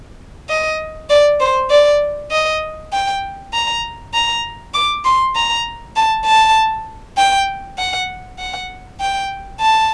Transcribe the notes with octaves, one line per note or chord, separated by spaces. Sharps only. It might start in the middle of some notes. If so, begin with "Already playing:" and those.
D#5
D5
C5
D5
D#5
G5
A#5
A#5
D6
C6
A#5
A5
A5
G5
F#5
F#5
G5
A5